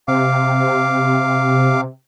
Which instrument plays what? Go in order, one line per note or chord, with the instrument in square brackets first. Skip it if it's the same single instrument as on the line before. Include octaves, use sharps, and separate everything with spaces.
[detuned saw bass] C3 [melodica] F5 D6